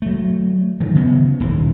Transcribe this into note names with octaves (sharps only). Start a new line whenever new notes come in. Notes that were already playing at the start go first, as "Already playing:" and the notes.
F#3 A3
D#3 F#3
C#3 B3 C#4
D#1 D#2 E3